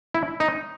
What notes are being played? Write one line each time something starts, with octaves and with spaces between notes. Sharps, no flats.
E4
D#4